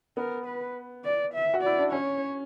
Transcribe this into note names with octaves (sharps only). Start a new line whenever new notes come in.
B3 A#4
B4
D5
E5
F#4
E4 D5
D4
C#4 C#5